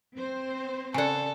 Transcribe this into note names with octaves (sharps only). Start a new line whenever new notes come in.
C4 C5
C#3 A4 D5 F#5 G#5